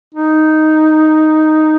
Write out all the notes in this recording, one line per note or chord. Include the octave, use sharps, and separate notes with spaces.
D#4